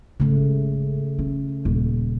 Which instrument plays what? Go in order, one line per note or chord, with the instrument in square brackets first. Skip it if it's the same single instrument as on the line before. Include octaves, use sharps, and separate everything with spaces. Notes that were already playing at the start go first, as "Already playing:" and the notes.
[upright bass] G#1 [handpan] C#3 A3
[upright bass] C#4
D#1